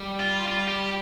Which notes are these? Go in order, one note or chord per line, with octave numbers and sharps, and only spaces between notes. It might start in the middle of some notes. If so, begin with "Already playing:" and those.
Already playing: G3
F4
F4
G4